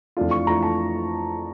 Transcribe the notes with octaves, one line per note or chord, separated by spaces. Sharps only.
F2 E3 A3 D4 F4
C#6
F2 E3 A3 D4 F4 A#5
A5